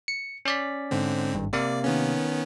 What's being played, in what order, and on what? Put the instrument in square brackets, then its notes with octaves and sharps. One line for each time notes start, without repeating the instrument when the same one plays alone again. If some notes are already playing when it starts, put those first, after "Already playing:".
[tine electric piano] C#7
C#4 D5 B6
[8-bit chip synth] G#2 D3 C4
[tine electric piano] G#1 G2
[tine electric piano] C3 A#3 F5 [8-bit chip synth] D5
[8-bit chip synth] D#3 B3 C#4